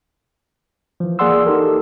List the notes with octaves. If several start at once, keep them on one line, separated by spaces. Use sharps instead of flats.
E3 F3
A#3 G#4 D5 F#5 C6 E6
D#4 G4 A4 A#4